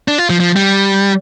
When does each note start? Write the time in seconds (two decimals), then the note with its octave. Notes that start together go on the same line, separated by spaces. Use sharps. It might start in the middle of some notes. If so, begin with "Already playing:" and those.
0.08 D4
0.18 F4
0.30 F3
0.40 F3
0.56 G3